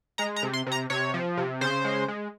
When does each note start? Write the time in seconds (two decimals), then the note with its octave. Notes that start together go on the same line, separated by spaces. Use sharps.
0.18 G#3 A#5
0.36 A#5
0.43 C3
0.53 C6
0.66 C3
0.72 A#5
0.90 C3 C#5
1.14 F3
1.37 C3
1.61 C#3 C5
1.84 G#3
2.08 G#3